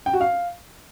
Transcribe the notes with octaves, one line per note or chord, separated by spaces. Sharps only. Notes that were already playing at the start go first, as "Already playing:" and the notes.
G5
F#4
F5